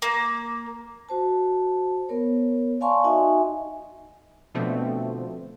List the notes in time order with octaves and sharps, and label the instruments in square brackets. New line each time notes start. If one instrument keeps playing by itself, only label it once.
[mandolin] A#3
[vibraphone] F#4 C5 A5
B3 A#4 C#5
D5 F5 G#5 A5 C6 C#6
D#4 F#4 D#5 E5 G#5
[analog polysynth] B2 D3 F3 A3 C4